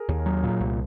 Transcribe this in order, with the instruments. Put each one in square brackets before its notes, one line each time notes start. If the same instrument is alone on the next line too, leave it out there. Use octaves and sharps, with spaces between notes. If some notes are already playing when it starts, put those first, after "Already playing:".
Already playing: [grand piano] G#4 A#4
[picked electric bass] D#2
F#3
A#2
C2